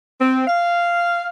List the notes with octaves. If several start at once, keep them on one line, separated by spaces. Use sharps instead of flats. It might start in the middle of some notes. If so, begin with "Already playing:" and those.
C4
F5